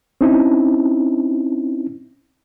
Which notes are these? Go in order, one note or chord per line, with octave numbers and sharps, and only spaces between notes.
C4 C#4 D#4 E4